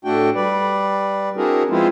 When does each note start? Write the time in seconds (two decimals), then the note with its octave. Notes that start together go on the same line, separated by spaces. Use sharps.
0.05 A2 A3 D4 F#4 G5
0.35 G3 B4 D5
1.37 C4 D4 E4 F#4 G#4 A#4
1.70 F3 G#3 B3 C4 E4 F4